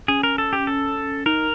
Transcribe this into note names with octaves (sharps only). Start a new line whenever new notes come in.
C#4 G#4
A#4
A4
G4
A4
D#4 A#4